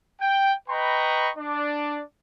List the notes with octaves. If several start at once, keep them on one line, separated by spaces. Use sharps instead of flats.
G5
B4 D#5 G5 A#5 B5 C#6
D4 D5